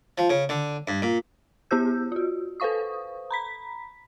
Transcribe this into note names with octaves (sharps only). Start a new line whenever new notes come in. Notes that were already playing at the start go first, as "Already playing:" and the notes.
F3
C#3
D3
G2
A#2
B3 E4 G4 C5 E6 G6
F4 F#4
A4 B4 C5 F5 C#6 D#6
A#5 B5 B6